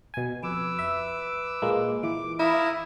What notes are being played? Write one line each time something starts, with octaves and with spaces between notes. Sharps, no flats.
B2 G#5
F2 B4 D6 E6
E5
A#2 G#3 A#3
E3 D6
E4 F5 A#5 D#6